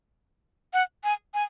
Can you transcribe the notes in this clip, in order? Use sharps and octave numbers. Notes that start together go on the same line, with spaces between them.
F#5
G#5
G#5